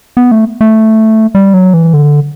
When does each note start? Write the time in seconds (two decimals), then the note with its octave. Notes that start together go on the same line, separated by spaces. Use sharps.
0.17 B3
0.31 A3
0.61 A3
1.35 G3
1.54 F#3
1.74 E3
1.94 D3